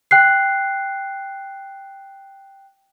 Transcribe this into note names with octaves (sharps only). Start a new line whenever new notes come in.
G5 F#6 C7